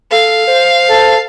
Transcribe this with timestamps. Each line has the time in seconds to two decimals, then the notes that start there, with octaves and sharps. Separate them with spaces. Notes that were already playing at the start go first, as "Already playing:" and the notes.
0.12 A4 F5
0.47 C5
0.89 A4